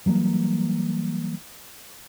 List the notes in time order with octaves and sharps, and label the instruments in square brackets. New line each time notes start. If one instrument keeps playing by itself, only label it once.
[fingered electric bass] E3 F#3 G3 A#3